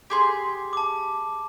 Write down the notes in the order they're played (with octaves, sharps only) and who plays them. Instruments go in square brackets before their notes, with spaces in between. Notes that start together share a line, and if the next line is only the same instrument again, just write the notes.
[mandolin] G4 G#4 C6
[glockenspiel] A5 D6